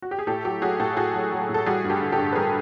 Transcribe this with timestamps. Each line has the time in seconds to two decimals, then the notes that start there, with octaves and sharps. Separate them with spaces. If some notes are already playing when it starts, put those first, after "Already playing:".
0.02 F#4
0.11 G4
0.19 G#4
0.27 A2 G4 A4
0.45 F#3 G4 A4
0.62 F#3 F#4 G#4
0.79 A2 G4 A4
0.97 A2 F#4 G#4
1.15 F#3
1.32 F#3
1.49 A2
1.54 A4
1.66 G3 F#4 G#4
1.84 G2
1.89 G4 A4
2.01 D3
2.12 G4 A4
2.18 G2
2.33 B4
2.36 G3 G#4 A#4